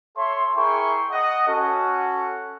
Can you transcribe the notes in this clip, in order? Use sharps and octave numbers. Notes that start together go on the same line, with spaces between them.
A4 C#5 E5 C6
E4 G#4 A#4 G5 C6 C#6
D#5 F#5
C#4 F#4 A4